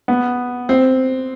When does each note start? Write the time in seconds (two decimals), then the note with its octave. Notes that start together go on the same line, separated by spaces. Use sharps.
0.08 B3
0.69 C4